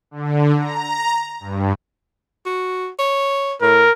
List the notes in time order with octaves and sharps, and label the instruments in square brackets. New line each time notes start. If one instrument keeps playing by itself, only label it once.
[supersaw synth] D3
A#5
G2
[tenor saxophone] F#4
C#5
[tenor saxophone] A2 [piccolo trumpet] A#4